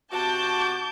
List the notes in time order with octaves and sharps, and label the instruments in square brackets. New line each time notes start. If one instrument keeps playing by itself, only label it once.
[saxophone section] C3 F#4 [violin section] A5 G6 [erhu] D6